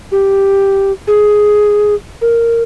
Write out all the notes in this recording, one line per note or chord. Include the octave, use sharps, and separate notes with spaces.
G4
G#4
A#4